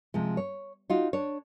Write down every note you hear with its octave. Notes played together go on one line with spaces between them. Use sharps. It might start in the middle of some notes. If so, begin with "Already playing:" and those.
C3 F3 G#3
C#5
D#4 F4 F#4
D4 C#5